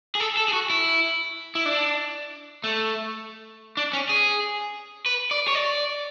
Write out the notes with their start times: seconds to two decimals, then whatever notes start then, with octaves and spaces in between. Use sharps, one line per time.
0.15 G#4
0.20 A4
0.37 A4
0.48 G#4
0.53 F#4
0.70 E4
1.55 E4
1.66 D4
2.64 A3
3.77 D4
3.93 C#4
4.09 G#4
5.06 B4
5.31 D5
5.48 C#5
5.55 D5